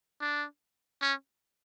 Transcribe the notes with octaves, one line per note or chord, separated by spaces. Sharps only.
D4
C#4